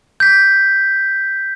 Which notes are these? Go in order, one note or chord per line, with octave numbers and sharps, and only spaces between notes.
G6 B6